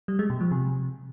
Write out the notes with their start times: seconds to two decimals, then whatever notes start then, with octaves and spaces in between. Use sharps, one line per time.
0.08 G3
0.19 G#3
0.30 B2
0.41 F3
0.51 C3